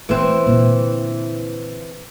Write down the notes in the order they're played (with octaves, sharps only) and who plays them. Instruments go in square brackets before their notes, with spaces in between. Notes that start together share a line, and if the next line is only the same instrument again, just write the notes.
[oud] E3 C4 [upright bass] A3 B3
[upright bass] A#2 D3